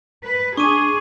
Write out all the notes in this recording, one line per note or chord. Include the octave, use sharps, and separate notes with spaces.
B4
D4 G#4 C#6 D6 D#7